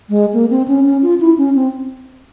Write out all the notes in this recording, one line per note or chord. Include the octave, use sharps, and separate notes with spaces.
G#3
A#3
C4
C#4
C#4
F4
E4
C#4
C4